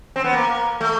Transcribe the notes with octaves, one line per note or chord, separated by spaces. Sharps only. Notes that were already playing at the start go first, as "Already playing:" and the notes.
C4
B3
A#3
A3